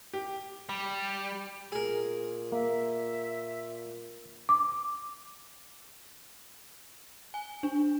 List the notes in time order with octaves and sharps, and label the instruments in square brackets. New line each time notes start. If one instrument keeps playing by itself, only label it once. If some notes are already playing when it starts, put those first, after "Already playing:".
[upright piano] G4
[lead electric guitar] G3
[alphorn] A#2 [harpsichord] G#4 A#4
[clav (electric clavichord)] A#3 [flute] E5
[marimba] D6
[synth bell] G#5
D4